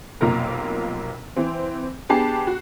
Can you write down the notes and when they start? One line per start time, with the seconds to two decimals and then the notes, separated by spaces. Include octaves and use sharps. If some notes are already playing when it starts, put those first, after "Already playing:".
0.21 F1 B1 A#3 F4 A#4 A#5
1.36 E3 C4
2.09 B3 D4 G4 G#4 A5 C7
2.47 F#4